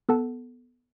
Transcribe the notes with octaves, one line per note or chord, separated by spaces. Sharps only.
B3 A4 F#5 A5